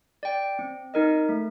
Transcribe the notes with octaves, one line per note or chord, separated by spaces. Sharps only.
D5 G5
C4
D#4 A#4 D#5
A3